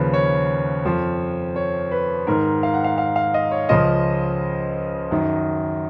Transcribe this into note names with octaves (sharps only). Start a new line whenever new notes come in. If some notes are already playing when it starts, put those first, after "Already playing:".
Already playing: D#2 C#3 F3 B4
C#5
F2 F3
C#5
B4
G#2 D#3 A#4
F5
F#5
F5
F5
F5
D#5
C#5
C#2 C#3 F3 D#5
F#2 D#3